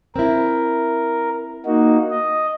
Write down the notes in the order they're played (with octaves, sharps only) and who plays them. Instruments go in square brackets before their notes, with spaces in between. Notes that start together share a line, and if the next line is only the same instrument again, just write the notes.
[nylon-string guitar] C4 E4 [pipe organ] A#4
[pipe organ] A#3 D#4 F#4
D#5